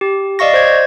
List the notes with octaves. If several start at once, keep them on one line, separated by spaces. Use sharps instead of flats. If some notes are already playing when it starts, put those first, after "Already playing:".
G4
D5 D#5 F5 C#6 A#6
C5 G#6